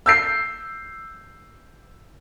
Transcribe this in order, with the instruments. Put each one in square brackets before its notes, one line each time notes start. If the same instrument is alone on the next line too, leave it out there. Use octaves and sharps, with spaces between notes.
[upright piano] E6 G6 C7